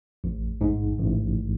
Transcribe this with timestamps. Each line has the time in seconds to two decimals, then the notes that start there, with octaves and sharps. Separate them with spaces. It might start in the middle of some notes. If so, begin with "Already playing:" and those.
0.24 A1
0.61 G#2
0.98 A1